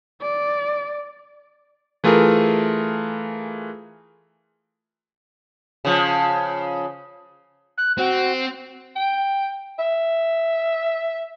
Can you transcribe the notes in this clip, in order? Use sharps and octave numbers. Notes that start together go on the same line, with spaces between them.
D5
E3 A3 F4 G#4 A#4
C#3 F3
F#6
C4 F#4
G5
E5